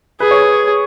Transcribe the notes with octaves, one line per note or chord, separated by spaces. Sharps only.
G#4 B4
C#5
B4